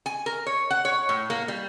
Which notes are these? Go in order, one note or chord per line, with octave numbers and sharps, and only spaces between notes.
G#5
A#4
C#5
F#5
C#5
A2
A#3
G3